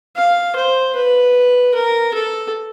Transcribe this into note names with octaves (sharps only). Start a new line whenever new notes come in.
F5
C5
B4
A#4
A4